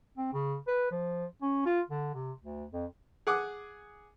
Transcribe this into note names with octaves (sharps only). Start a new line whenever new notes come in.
C4
C#3
B4
F3
C#4
F4
D3
C3
D2
F2
G#4 F#5 D6 D#6